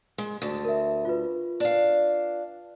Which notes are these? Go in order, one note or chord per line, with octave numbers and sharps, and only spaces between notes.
G#3
D2 A5
A#4 E5
F4 B4
D4 F5